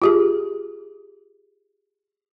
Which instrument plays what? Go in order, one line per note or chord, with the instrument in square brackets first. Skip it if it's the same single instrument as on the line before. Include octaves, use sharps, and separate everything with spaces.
[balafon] F4 G4 G#4